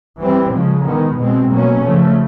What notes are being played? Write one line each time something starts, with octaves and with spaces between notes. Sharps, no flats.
E3 G3 C4
C#3 F3 G#3
D#3 G#3 B3
B2 G#3 C4
B2 F#3 A#3 C#4
C#3 F3 A3